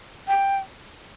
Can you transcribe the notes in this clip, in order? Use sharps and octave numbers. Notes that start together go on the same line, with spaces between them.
G5